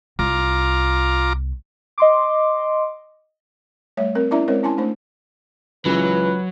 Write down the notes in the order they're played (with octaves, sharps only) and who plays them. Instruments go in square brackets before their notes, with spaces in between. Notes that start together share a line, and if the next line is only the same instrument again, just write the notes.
[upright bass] C2 [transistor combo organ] F4 A#5 D6
[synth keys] D#5 C6 D6
[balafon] G3 A3 C#5 E5
C4 A#4
C#4 D4 E4 D5 E5 A#5
G#3 C4 A#4 C5 C#5 D#5
C#4 E4 G#5 A5 C6
A3 D4 C5
[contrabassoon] C#2 [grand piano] C#3 E3 [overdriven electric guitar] F#3 [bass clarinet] B4